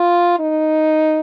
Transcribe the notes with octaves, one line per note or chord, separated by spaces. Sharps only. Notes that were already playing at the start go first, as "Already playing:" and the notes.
Already playing: F4
D#4